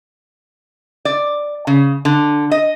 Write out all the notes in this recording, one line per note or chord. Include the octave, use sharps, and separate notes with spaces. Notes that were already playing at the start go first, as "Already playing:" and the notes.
D5
C#3
D3
D#5